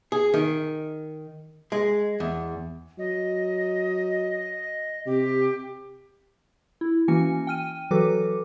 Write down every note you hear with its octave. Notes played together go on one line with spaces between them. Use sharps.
G#4
D#3
G#3
E2
F#3 D#5
C3 G4
E4
E3 A#3 C#4 F#4 G#5 C#7
G5 F6 D#7
E3 F#3 F#4 A4 B4 D6